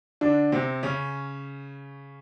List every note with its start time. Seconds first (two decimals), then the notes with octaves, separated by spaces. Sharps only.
0.21 D3 D4
0.52 C3 C4
0.83 C#3 C#4